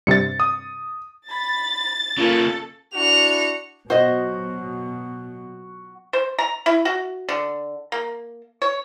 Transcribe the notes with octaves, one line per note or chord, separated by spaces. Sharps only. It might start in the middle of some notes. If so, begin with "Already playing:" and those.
G2 C3 A6 C#7
D#6
B5 A6
C#3 A#3 F4 A4
D4 E4 F#4 C#7 F7
B2 F#3 B3 F#4 C5 D#5
C5
A#5
E4
F#4
D3
A#3
C#5